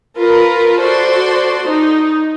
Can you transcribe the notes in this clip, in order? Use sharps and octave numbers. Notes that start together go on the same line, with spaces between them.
F4 A#4 B4
F#4 A4 C5 D5 C6
D#4